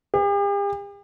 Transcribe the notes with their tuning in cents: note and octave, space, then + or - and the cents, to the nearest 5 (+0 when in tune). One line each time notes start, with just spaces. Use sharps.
G4 +45